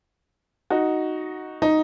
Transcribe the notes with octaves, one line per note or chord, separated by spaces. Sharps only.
D#4 F#4
D#4